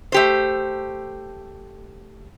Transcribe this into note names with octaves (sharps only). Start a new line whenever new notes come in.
A3 G4 C5